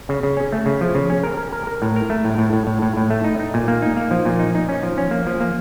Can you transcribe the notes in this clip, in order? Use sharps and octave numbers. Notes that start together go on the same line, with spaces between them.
C#3
C#3
C#4
A3
C#3
F3
C#3
C#4
A#4
A#4
A#4
A#4
A2
A#4
A3
A2
A2
A2
A2
A2
A2
A3
D#4
D#4
A#2
A#3
D#4
A#3
F3
A#2
D#4
D#4
C#4
F3
C#4
A#3
F3
A#3